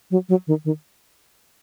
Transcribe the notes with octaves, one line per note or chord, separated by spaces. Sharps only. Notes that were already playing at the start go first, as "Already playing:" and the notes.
F#3
F#3
D#3
D#3